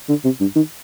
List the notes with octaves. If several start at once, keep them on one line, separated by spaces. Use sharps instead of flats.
D3
C3
G2
D#3